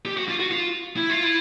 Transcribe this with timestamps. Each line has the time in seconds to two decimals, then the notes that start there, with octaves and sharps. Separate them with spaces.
0.06 G4
0.17 F#4
0.29 F4
0.40 F#4
0.51 F4
0.97 E4
1.10 F4
1.23 E4